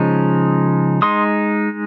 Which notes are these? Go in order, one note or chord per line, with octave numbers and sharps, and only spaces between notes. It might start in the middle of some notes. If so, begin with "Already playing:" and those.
Already playing: C#3 F3 G#3 D#4
G#3 D#4 C6 D#6